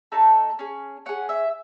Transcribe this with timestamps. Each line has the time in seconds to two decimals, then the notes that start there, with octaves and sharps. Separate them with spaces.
0.12 A3 D#4 A4 A5
0.59 C#4 G#4
1.06 C#4 G#4 F#5
1.29 E5